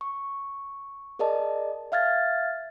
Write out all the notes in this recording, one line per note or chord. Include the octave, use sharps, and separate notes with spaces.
C#6
G#4 A#4 D5 D#5 A5
E5 F5 F6 G#6 A6